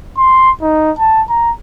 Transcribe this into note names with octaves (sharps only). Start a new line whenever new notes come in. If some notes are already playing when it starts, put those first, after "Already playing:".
C6
D#4
A5
A#5